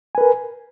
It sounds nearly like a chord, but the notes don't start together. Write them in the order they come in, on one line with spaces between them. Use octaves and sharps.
G#5 B4 A#4